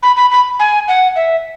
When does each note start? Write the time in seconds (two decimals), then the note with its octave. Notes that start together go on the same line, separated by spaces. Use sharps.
0.03 B5
0.16 B5
0.31 B5
0.59 G#5
0.88 F#5
1.16 E5